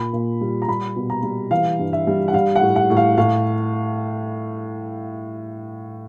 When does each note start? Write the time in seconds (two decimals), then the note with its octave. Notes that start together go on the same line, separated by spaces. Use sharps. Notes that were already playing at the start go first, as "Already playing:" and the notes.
Already playing: A#2 B5
0.13 A#2
0.41 G3
0.62 A#5
0.68 G3 B5
0.96 B2
1.10 A#5
1.23 G3
1.51 E3 F5
1.79 G2
1.93 E5
2.07 G3
2.28 F#5
2.34 G3 F5
2.56 F#5
2.62 A2
2.76 F#5
2.90 A2
2.97 F5
3.17 A2 F5